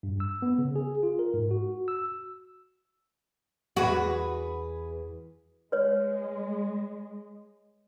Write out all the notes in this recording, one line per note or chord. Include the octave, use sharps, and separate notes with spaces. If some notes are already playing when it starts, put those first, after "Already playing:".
G2
E6
B3
C#3
G#4
F4
A#4
G#2
F#4
E6
E2 F#4 G#4 B4
G#3 B4 C#5